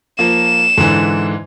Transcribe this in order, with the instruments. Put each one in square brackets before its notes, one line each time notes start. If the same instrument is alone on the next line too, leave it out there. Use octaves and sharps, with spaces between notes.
[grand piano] F3 A#3 [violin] E7
[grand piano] G#2 D3 E3